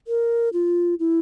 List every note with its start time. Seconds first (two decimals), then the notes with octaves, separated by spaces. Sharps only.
0.07 A#4
0.53 F4
0.99 E4